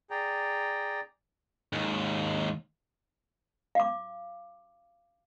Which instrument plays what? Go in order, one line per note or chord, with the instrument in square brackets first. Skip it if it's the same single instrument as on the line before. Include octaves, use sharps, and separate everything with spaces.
[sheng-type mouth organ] G#4 G5 A#5 [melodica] D5
[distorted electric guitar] D#2 G#2
[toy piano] F5 D6